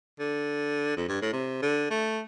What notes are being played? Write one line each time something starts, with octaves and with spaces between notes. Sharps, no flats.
D3
F2
G2
A2
C3
D3
A3